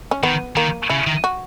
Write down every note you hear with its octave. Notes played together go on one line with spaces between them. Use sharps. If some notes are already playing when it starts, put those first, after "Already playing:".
C#4
D#3 B3
D#3 A#3
C#3 E4
D#3
F#4